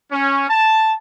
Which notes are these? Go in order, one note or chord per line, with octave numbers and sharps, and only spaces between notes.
C#4
A5